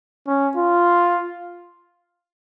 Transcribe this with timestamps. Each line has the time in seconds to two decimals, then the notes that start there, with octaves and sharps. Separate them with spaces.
0.27 C#4
0.56 F4